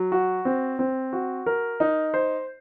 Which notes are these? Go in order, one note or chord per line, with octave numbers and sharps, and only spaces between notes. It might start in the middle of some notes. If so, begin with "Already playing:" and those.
Already playing: F#3
F#4
C4
C4
F#4
A#4
D#4
C5